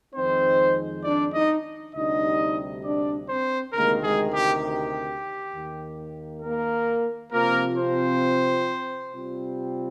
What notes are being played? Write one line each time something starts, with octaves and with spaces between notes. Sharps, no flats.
F2 D#3 G#3 C4 D#4 C5
D4 D5
D#4 D#5
D2 C3 G3 D4 D#4 D#5
D4 D5
C4 C5
D2 C3 D#3 G#3 A#3 A#4
G#3 G#4
G4
G4
D#2 D#3 A#3
A#3 A#4
C3 F3 A#3 C4 F4 A#4
C4 C5
C3 G3 C4 F4